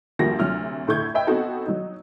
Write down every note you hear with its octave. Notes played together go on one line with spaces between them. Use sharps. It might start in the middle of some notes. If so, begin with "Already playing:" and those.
D2 F3 G3 A#3 F#4 A#6
D2 C3 F#3 F6
A2 D3 E4 C#6 G6 G#6
B4 D#5 E5 G5
B3 C4 D#4 F#4 A4
F#3 D#4